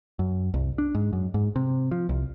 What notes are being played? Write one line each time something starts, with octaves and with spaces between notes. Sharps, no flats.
F#2
C2
D4
G#2
F#2
G#2
C3
F3
C2